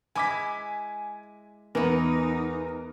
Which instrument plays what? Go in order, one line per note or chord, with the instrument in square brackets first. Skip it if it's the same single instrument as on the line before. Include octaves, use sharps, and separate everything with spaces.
[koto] G#3 E4 [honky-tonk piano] G#5 D6 B6
[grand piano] E2 [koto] E3 B3 [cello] D#4 [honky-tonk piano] A#4